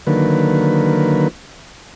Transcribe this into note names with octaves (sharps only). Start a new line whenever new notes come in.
D3 D#3 F#3 A#3 B4